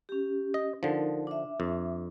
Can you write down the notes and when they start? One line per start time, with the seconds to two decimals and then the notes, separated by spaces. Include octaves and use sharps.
0.09 C#4 G4
0.54 D#5
0.83 D3 F3 D#4 A#4
1.27 D4 E5
1.60 F2